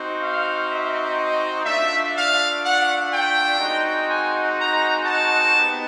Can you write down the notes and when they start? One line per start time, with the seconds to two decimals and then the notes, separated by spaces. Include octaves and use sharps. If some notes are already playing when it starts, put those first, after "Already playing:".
Already playing: C4 D#4 F#4
0.20 F5
0.69 E5
1.16 D#5
1.65 A3 D4 F4 E5
2.14 F5
2.62 F#5
3.10 G5
3.59 G#3 C4 D#4 F#4
4.07 G#5
4.56 A#5
5.05 A5
5.53 B3 D#4 G4